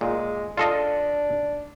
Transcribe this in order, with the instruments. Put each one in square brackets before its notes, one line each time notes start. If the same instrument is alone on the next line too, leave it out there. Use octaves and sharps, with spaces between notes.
[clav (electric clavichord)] A#2 [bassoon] G#3
[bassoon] D4 [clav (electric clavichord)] F4 A4 D#5